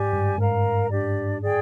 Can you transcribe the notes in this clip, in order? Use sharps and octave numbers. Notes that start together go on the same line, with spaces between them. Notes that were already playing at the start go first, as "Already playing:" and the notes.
Already playing: G#2 G4 D5 G#5
G2
G#2 A#4 F5 A#5
D4 G4 D5
G#4 D5 G5